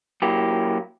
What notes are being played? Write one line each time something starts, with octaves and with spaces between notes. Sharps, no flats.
F#3 A#3 E4 G4